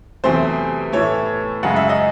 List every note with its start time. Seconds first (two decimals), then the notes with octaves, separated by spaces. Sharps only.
0.24 E2 C3 F#3 A3 C5
0.92 A2 E3 A3 C#5
1.63 F#2 C#3 G#3 F#5
1.76 E5
1.89 D#5